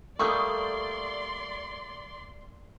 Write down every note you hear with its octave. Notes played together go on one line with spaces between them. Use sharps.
G3 A3 A#3 D5 C6 C#6 D#6 G6